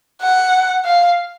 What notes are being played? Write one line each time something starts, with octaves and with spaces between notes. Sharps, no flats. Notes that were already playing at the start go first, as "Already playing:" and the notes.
F#5
F5